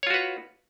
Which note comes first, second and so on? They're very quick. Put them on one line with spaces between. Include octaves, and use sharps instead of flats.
C#5 F4 F#4 B4